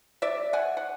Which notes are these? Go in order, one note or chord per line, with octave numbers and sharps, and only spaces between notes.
D5 E5
F#5 G#5
F#5